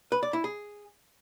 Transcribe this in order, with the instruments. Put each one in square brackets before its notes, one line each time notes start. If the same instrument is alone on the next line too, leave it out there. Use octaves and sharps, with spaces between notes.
[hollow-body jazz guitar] B4
D5
E4
G#4